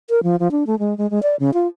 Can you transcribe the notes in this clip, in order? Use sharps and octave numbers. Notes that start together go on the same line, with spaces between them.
A#4
F3
F3
D4
A3
G#3
G#3
G#3
D5
C#3
F4